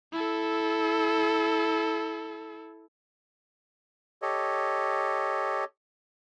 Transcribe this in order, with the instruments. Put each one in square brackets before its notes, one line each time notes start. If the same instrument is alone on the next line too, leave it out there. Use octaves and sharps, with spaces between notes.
[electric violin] E4 A4
[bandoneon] G4 A4 C#5 D#5